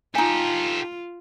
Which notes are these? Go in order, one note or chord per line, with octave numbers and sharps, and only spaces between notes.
D#4 F4 G4 A4 G#5